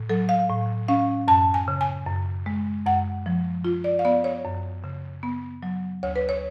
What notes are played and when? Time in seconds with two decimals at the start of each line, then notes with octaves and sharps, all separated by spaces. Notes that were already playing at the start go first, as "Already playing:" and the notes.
Already playing: A2
0.09 F#3 A4
0.29 F5
0.49 A2
0.88 C#4 F5
1.28 F#2 A5
1.54 G#5
1.68 C#3
1.81 G#5
2.06 F#2
2.46 G#3
2.86 F#2 F#5
3.26 F3
3.65 F4
3.84 D5
3.99 F5
4.05 B3 D5
4.24 C#5
4.45 F#2
4.84 C#3
5.23 B3
5.63 F#3
6.03 D2 C#5
6.16 B4
6.29 C#5